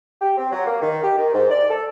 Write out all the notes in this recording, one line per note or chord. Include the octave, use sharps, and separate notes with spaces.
G4
C4
F#3
A#3
D#3
G4
D#3
G#2
D5
A4